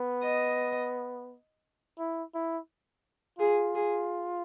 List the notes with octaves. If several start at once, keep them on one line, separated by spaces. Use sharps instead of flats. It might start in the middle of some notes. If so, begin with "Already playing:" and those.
Already playing: B3
D#5
E4
E4
F4 G#4
G#4